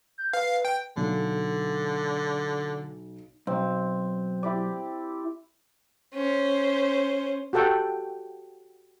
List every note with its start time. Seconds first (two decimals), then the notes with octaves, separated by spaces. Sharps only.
0.18 G6
0.33 B4 F5
0.65 G5
0.97 B1 D3
3.47 B1 C4
4.43 E4 G4 D5
6.14 C#4 C5
7.53 F#4 G4 A4 F#5 G5